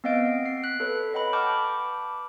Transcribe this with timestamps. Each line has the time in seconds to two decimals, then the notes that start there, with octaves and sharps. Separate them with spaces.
0.04 B3 C4 D#5 F5 A6 D7
0.46 C7
0.64 F#6 B6 C7
0.80 A4 B4 C#5
1.13 B4 D#5 F#5 G5 B5
1.33 A5 B5 C#6 D6 F6 G6